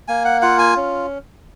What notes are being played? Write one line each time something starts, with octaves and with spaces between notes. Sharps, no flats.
A#3 G#5
F#5
F4 F#5
G#5
C#4